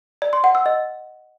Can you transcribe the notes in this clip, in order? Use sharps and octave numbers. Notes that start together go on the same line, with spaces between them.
D5
C6
F#5
E6
D#5